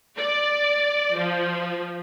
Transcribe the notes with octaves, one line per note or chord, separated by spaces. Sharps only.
D5
F3